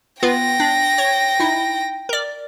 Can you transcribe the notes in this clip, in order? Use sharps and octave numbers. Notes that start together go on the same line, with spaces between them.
B3 F4 B4 G5 A#6
D4
C#5
D#4 E4
A#4 D5